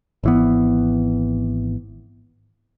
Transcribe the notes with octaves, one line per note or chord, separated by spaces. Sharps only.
G#1 E3 B3